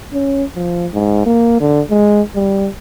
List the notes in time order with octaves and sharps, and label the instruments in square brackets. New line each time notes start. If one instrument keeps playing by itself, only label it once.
[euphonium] C#4
F3
G#2
A#3
D3
G#3
G3